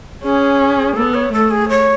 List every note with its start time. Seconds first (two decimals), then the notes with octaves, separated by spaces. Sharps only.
0.23 C#4 G#4
0.96 B3 A4
1.14 C#5
1.33 A3 A4
1.51 G#4
1.69 C#5